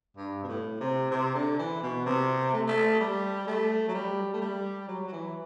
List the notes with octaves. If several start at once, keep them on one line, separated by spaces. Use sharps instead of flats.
G2
B2
A2
C3
C3
D3
E3
B2
C3
A3
A3
G3
A3
F#3
G3
A3
G3
F#3
F#3
E3